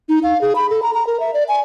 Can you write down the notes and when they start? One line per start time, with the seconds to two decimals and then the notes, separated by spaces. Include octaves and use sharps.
0.09 D#4
0.23 F5
0.41 G#4
0.55 B5
0.70 A4
0.82 A#5
0.94 A#5
1.07 A#4
1.20 E5
1.34 D5
1.48 G#5